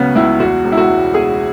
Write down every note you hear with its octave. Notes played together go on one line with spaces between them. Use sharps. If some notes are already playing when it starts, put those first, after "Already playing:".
Already playing: C#2 C#3 F#3 B3 C#4 F#4
C#2 E4
E2 F#4
E1
E4
F#4
E1
B2 G#4